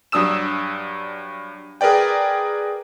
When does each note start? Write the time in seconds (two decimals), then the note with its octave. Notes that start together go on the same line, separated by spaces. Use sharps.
0.12 G2 F#3 D4 D#6 E6 E7
1.81 G#4 A#4 B4 D5 G5